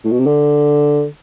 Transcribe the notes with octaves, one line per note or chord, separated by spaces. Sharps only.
A2
B2
C3
D3